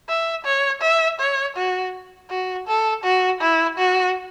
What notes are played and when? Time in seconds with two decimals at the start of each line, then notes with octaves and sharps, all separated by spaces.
0.09 E5
0.44 C#5
0.81 E5
1.19 C#5
1.56 F#4
2.30 F#4
2.67 A4
3.03 F#4
3.41 E4
3.78 F#4